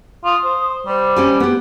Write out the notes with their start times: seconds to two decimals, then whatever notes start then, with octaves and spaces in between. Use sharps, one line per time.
0.25 F4 D#6
0.44 C5
0.86 G3 C5
1.16 C#4 G4 G#5
1.40 B3 G4